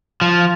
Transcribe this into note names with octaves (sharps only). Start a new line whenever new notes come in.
F3